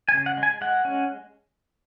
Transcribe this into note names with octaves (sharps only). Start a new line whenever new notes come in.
G#5
C#3
F#5
G#3
G#5
G#3 F#5
C#4